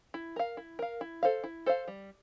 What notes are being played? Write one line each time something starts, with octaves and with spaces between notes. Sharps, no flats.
E4
A#4 F5
E4
A#4 F5
E4
A4 C5 F5
E4
A4 C5 F5
G3